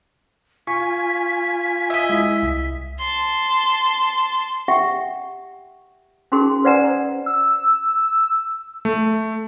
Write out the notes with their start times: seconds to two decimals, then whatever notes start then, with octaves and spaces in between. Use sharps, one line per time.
0.67 F4 G#5 C#6 B6
1.90 D#5 E5
2.10 G#3 E4
2.43 C2
2.99 A5 C6
4.68 G4 E5 F#5 G5
6.32 C#4 D#4 F#4 G#4 A#4 C6
6.64 B4 C5 D5 F#5 G#5 A#5
7.26 E6
8.85 A3